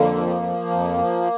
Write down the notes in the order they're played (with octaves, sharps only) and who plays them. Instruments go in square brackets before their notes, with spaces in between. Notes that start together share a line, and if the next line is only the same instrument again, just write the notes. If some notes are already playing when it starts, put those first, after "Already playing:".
Already playing: [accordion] F2 D3 A#3
F3
F3
F2
F3